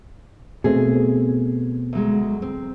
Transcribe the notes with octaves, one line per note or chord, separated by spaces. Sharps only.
B2 A3 C4 G#4
D2 F#3 G#3
C4